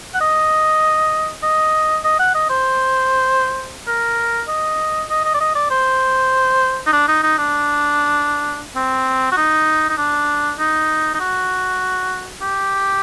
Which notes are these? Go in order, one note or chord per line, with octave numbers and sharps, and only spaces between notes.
F#5
D#5
D#5
D#5
F#5
D#5
C5
A#4
D#5
D#5
D#5
D5
D#5
D5
C5
D#4
D4
D#4
D#4
D4
C4
F#4
D#4
D#4
D4
D#4
D#4
F#4
G4